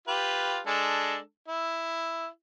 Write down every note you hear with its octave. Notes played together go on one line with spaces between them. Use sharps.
F4 G4 B4
G#3 D4 A4
E4